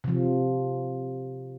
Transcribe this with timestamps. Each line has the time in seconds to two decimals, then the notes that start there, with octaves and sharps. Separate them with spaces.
0.04 C3 F3